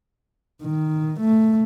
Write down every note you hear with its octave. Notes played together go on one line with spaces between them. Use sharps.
D#3
A3